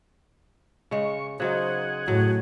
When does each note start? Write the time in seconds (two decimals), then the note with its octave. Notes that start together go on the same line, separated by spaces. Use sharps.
0.91 C#3 G#3 C#6
1.40 C#3 F#3 D#4 G#4 C5 F#5
2.08 A2 F#3 F#4